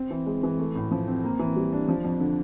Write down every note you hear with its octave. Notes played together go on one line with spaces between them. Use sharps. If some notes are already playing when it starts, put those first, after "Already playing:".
Already playing: C4
E3
G#3
E3
A3
A2
F3
C4
A#3
E3
G3
D4
F3
F2
D3